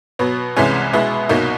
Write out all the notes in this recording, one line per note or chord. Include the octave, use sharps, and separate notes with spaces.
B2 F#3 B3
C2 C3 E3 G#3 C#4
B2 G#3 B3 E4
C2 B2 F#3 A#3 D#4